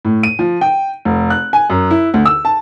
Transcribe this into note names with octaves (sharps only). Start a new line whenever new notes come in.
A2
D#7
F3
G5
F1
F#6
G#5
F#2
E4
D2
E6
A5